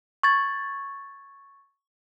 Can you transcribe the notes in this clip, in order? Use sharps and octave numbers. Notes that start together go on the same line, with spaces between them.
C#6 G#6 A6